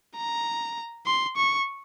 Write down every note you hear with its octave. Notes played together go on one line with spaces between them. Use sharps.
A#5
C6
C#6